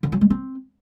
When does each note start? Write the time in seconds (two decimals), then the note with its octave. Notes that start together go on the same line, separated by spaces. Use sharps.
0.03 D3
0.12 F#3
0.21 G#3
0.30 C4